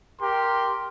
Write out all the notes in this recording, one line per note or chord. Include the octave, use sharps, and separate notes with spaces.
G4 A#4 C6